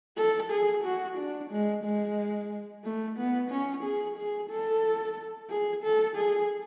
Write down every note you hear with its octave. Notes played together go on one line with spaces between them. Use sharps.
A4
G#4
F#4
D4
G#3
G#3
A3
B3
C#4
G#4
G#4
A4
G#4
A4
G#4